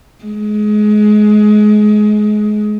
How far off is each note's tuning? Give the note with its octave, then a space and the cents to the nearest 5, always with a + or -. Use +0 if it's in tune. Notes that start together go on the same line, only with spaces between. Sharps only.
G#3 +25